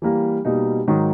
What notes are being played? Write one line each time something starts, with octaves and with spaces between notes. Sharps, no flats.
E3 G3 A#3
B2 G3 A#3 D#4
G#2 D#3 F#3